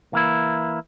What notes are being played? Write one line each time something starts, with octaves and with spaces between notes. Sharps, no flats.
E3 A#3 E4